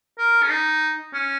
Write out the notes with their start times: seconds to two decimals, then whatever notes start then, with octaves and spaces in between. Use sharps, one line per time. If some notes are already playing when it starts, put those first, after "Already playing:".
0.18 A#4
0.43 C#4
0.50 D#4
1.13 C#4